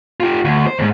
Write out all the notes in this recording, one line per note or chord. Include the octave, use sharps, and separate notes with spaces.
F4 G4
D2
C5
D2 G#2